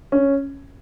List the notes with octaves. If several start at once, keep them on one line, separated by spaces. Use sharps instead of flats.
C#4